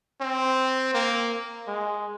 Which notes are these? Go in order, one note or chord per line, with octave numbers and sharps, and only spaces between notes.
C4
A#3
G#3